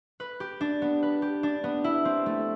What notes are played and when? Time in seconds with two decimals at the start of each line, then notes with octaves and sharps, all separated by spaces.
0.20 B4
0.40 G4
0.61 D4
0.82 B3
1.03 B4
1.22 G4
1.43 D4
1.64 B3
1.84 E4
2.05 C4
2.26 A3